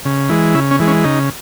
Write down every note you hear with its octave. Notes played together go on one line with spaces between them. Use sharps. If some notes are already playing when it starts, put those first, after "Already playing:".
C#3
E3 G#3
C#3 E4
C#4
E3 G#3
C#4
C#3 D#4